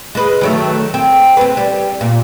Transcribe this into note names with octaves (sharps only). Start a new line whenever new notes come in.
G#3 B4
D#3 F#3 A3
C4
C4 B4
G3
A#2